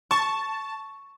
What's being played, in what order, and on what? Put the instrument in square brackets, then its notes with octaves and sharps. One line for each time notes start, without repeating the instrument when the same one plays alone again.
[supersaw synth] A5 [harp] C#6